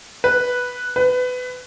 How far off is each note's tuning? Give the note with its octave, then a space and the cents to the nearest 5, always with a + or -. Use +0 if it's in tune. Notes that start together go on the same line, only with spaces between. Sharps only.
B4 -5
B4 +20